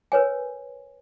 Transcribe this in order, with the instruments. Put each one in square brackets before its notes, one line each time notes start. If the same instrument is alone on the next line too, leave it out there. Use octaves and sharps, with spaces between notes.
[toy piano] A#4 B4 C#5 G#5